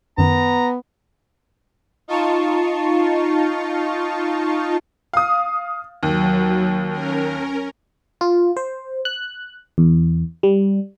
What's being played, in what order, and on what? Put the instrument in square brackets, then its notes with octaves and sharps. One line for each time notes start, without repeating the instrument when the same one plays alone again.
[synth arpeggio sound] F#2 D#3 [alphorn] B3 [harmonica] A#5
[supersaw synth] D#4 F4 A5 C#6
[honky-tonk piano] F5 D#6
[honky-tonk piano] D#2 [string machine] F#3
[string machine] C#4 A#4
[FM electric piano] F4
C5
F#6
E2
G3